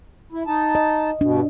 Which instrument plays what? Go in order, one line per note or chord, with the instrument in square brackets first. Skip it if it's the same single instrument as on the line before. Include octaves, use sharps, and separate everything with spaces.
[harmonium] E4
D#4 A5
[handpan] D#5
[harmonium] G2 B2 [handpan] D4